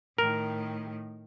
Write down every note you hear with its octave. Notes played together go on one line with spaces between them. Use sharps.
A2 D#3 A#4